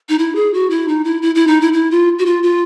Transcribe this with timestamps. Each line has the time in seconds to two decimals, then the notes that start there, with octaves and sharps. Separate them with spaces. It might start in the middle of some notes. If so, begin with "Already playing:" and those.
0.09 D#4
0.19 E4
0.35 G#4
0.54 F#4
0.70 E4
0.88 D#4
1.04 E4
1.22 E4
1.35 E4
1.47 D#4
1.61 E4
1.73 E4
1.91 F4
2.19 F#4
2.26 F4
2.43 F4